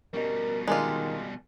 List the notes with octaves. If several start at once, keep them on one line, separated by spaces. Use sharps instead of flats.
B2 G3 C#4 G4 A#4 D#5
D#3 G#3 D4 F4 A#4 G#5 A#5